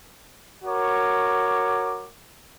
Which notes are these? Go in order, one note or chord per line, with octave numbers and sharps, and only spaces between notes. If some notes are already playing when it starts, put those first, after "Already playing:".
F#4 A#4 C#5 D6